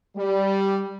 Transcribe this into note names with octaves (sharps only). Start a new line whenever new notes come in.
G3